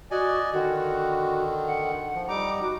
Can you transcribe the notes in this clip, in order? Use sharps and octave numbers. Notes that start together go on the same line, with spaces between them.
F#4 D5 D#5 G#5
D3 D#3 F#4
F#5
F3
G3 D#4 A#5 D6
F#4